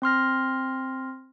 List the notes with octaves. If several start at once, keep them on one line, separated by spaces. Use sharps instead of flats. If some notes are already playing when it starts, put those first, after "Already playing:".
C4 C6 F6 A#6